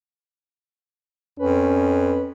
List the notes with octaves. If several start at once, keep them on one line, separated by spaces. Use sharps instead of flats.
F2 C#4 B4